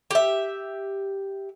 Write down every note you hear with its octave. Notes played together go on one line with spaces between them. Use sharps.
G4 E5